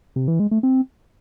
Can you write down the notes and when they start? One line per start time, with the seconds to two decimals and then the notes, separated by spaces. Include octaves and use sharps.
0.16 C3
0.28 E3
0.40 G#3
0.51 A3
0.63 C4